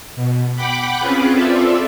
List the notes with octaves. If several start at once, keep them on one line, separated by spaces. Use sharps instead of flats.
B2
F#5 G5 B5 D6 F#6
C4 C#4 F4 G#4 B4
C4 F4 A4 D5 E5